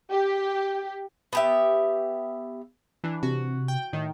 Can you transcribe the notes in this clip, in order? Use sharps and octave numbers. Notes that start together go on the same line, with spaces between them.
G4
B3 G4 E5
E3 D4
C3 F#4
G5
A2 D#3